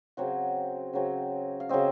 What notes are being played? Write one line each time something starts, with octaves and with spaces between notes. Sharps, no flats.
C#3 F#3 C4 F#5
C#3 F#3 C4
F5
C#3 F#3 C4 D#5